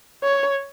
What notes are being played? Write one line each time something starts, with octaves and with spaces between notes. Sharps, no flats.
C#5